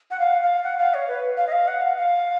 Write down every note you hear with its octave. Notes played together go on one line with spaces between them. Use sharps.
F#5
F5
F5
F#5
F5
C#5
B4
F5
D#5
F5
F#5
F5
F5